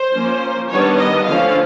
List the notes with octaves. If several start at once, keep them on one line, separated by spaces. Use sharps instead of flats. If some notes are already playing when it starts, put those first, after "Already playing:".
Already playing: C5
F3 A#3 C#4
D#3 G3 B3 D4 C#5
D#5
D3 F3 A3 C#4 F5